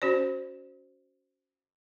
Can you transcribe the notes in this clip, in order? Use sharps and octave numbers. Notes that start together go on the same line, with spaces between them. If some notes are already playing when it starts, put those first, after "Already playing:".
C#4 F#4 C5 D5